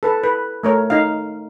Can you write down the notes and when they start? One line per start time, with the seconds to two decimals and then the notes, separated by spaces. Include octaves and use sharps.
0.03 A4 B4 A5
0.24 B4
0.63 A3 A#4 C#5
0.90 D#4 D#5 F5